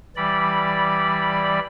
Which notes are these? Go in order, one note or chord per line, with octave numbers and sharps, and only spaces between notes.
E3 G3 D5 B5